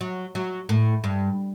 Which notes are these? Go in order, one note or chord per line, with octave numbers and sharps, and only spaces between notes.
F#3
F#3
A2
G2